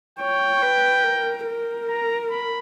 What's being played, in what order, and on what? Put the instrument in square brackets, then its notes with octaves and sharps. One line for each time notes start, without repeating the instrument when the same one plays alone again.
[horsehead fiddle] C#5 [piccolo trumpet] G5
[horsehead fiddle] B4
A#4
A#4
[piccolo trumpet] A#5
B5